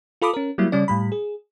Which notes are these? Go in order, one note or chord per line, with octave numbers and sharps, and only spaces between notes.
F4 A4 B5 D6 D#6
C#4 A#4
F#3 G3 A#3 E4
C#3 G3 C#4 D5
A2 G3 B5
G#4